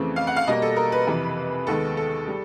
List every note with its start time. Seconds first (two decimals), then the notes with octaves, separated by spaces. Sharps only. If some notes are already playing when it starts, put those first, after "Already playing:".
Already playing: F2 C#3 E3 A3 C4
0.16 F5
0.27 F#5
0.36 F5
0.47 B2 G3 A#3 D#5
0.62 A4
0.76 A#4
0.92 B4
1.07 F2 C3 E3
1.67 D#2 D#3 G#3 B3 A4
1.97 A4
2.27 G3